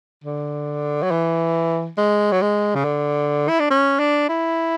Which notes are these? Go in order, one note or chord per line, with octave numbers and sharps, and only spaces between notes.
D3
F#3
E3
G#3
F#3
G#3
C#3
D3
E4
D4
C#4
D4
E4